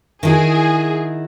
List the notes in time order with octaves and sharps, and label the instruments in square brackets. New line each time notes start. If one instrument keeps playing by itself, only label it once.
[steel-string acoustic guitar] D#3 E4 F#4 [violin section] G#4